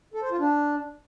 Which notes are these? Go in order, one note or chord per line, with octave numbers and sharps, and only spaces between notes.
A4
C5
F4
D4